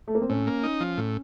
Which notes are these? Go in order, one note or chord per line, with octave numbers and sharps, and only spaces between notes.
A3
A#3
C4
A2 C#4
A#3
D#4
F3
A2